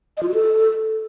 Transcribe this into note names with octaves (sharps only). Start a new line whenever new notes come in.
D#5
F4
F#4
A4